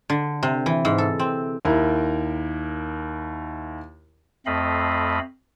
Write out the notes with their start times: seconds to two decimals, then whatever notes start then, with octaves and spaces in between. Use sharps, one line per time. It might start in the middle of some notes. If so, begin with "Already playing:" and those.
0.10 D3
0.43 C3
0.66 E3
0.85 G#2
0.98 A4
1.19 C4
1.65 D#2 E4 A#4
4.46 F2 A3 C4 D#5 F5 B5